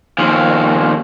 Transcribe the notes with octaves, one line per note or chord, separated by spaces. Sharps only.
D#2 F3